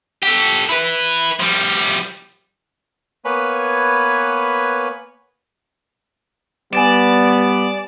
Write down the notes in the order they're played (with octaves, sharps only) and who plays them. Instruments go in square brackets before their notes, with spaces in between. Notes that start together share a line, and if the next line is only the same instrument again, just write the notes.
[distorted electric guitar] G4 A4
E4 B4
F3 G3
[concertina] A#3 B3 B4 C#5 G#5 B5
[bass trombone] G3 [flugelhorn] B3 [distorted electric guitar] D5 [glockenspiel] G#5 A6 E7